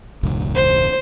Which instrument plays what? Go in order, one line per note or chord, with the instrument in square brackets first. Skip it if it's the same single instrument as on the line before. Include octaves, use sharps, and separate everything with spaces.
[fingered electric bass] E1 C#2 G#2
[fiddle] C5